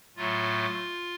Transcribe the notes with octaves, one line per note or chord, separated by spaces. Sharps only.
A2 F#3 A3 F4